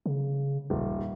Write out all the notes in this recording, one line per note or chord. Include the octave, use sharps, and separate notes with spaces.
C#3
D#1 A1